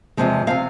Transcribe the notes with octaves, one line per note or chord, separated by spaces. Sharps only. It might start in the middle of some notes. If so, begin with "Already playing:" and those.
E2 C3 F3 G#3
C3 F3 G#3 F5